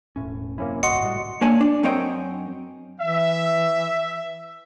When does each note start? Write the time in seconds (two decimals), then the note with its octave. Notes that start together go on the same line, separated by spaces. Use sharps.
0.16 E1 A2 C#4
0.58 F#2 C3 A#3 C#4 E4
0.83 G1 C2 F#4 D#5 F#5 C6 C#7
1.02 A2 G3
1.41 A#3 D4 C#5 D5 G#5 A5
1.61 D4
1.83 F#2 C4 A#4 C#5 D#5 G5
3.01 E3 E5